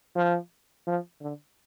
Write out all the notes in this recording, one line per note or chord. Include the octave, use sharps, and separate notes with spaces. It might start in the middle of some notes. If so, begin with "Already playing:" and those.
F3
F3
D3